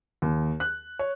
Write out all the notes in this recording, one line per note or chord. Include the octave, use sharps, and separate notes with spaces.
D#2
F#6
C#5